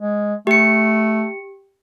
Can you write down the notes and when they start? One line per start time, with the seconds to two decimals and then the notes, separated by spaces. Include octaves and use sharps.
0.01 G#3
0.47 A3 G4 C#7